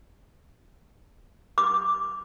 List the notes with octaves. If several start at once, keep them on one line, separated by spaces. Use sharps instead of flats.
D6